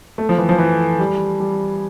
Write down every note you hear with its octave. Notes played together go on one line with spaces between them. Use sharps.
A3
F3
E3
F3
E3
G3
G3